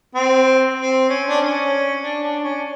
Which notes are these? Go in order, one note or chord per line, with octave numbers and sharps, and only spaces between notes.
C4
C4
C#4
D4
C#4
D4
D4
C#4